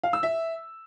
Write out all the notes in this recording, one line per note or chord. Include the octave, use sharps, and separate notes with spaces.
F5
E6
E5